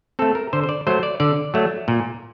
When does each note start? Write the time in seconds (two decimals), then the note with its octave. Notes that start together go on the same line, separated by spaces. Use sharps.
0.19 A3 C4 A4
0.35 A#4
0.53 D3 C5
0.63 C5
0.69 D5
0.87 F#3 A3 C5
1.03 D5
1.20 D3 D5
1.54 F#3 A3
1.88 A#2